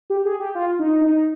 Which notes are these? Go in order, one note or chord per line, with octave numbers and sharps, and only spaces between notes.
G4
G#4
G4
F4
D#4
D#4